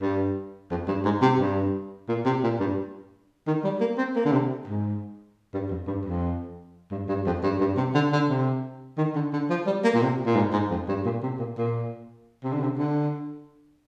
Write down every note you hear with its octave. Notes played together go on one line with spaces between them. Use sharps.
G2
F2
G2
G#2
C3
G2
A#2
C3
A#2
G2
D#3
G3
A#3
C4
A#3
D3
C3
G#2
G2
F2
G2
F2
G2
G2
F2
G2
G2
C3
D3
D3
C3
D#3
D3
D3
F3
G3
A#3
A#2
C3
A#2
G#2
G#2
F2
G2
A#2
C3
A#2
A#2
C3
D3
C3
D3